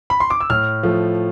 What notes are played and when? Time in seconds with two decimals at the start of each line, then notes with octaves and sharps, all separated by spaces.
0.10 B5
0.20 C6
0.30 D6
0.40 E6
0.50 A2 F6
0.83 F3 A3